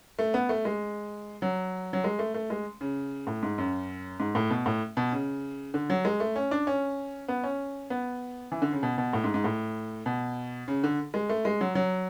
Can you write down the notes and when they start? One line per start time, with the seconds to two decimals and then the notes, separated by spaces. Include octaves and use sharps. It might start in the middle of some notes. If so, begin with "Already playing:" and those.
0.19 A3
0.34 B3
0.49 A3
0.65 G#3
1.42 F#3
1.93 F#3
2.04 G#3
2.19 A3
2.34 A3
2.50 G#3
2.81 C#3
3.27 A2
3.43 G#2
3.58 F#2
4.20 G#2
4.35 A2
4.50 B2
4.66 A2
4.97 B2
5.12 C#3
5.74 D3
5.90 F#3
6.05 G#3
6.20 A3
6.36 C#4
6.51 D4
6.67 C#4
7.28 B3
7.44 C#4
7.90 B3
8.52 E3
8.62 D3
8.73 C#3
8.83 B2
8.98 B2
9.13 A2
9.24 G#2
9.34 G#2
9.44 A2
10.06 B2
10.68 C#3
10.84 D3
11.14 G#3
11.29 A3
11.45 G#3
11.61 F#3
11.75 F#3